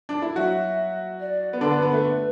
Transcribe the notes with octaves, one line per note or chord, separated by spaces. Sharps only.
D4
E4
F#3 F#4 E5
D5
B3
D3 D4 B4
B3
B3
A3